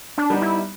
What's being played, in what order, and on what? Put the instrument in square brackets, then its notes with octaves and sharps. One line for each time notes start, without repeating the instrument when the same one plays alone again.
[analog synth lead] D4
[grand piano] G3 B3 D#4
[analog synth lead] E4